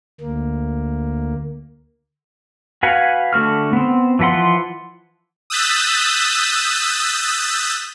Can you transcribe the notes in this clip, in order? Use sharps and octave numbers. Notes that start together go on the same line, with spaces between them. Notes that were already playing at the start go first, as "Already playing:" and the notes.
D2 A#3
F#4 B4 F5 F#5 G#5
D3 A3 F#4 F6
B3 C4
E3 F3 B4 F#5 C6
D#6 E6 F#6 G6 A6 B6